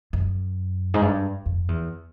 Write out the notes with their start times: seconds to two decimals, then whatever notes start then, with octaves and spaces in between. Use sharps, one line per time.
0.13 F#2
0.94 G#2
1.02 G2
1.46 F2
1.68 E2